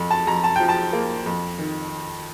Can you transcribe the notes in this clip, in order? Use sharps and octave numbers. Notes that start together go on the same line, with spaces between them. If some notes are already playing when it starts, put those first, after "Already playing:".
Already playing: F2
A5
F2 A#5
A5
F3 G5
A5
A#3
F2
D#3